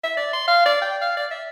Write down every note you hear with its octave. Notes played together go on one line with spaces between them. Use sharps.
E5
D5
C6
F5
D5
G5
F5
D5
E5